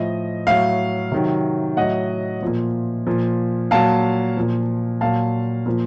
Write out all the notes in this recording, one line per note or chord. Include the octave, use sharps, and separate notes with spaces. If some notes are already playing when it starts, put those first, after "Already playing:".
Already playing: A2 F3 D#5
A2 F#3 F5
C3 D#3 F#3
A2 F#3 D#5 F#5
A#2 F3
A#2 F3
A#2 F#3 F5 A5
A#2 F3
A#2 F#3 F5 A5
A#2 F3